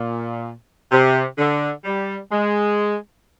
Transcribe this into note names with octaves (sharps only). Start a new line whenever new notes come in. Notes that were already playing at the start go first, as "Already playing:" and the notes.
Already playing: A#2
C3
D3
G3
G#3